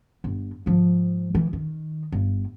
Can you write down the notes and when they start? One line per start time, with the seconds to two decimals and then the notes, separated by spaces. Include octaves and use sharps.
0.24 G1
0.66 G#2 F3
1.35 E3
1.53 D#3
2.12 G1